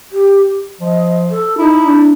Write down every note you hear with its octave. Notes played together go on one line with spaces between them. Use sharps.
G4
F3 D#5
A4
D#4 E4
D4